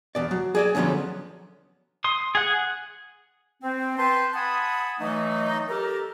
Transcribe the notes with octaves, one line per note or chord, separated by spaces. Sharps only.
E2 B2 D5
F#3
G#4 D5 G#5
D3 F3 F#3 B3 C#4
C6 D#6
G#4 F#5
C4
B4 G5 A5 C6
F#5 G#5 A5 B5 D#6
E3 F#3 A3 D#4
G4 A4 A#4